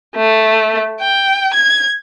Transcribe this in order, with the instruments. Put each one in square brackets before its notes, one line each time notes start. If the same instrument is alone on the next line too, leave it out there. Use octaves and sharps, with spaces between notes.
[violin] A3
G5
G#6